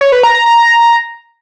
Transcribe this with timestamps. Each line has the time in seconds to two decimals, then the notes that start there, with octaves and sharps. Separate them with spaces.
0.01 C#5
0.12 B4
0.23 A#5
0.35 A#5
0.46 A#5